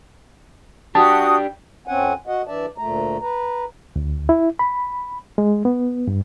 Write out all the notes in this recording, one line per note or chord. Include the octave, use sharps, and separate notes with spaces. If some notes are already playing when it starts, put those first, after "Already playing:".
D4 F#4 G4 A5 D#6
F2 C4 C#4 F#5 G#5
F#4 D#5 F#5
E3 D4 D5 E5 A5
D2 A#2 A3 A#5
B4 A#5
D2
E4
B5
G#3
B3
G2